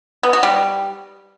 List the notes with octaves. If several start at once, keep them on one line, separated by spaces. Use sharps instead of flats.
B3
F#4
G3